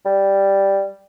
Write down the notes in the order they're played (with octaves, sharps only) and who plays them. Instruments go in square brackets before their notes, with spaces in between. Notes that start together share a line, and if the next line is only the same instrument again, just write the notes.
[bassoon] G3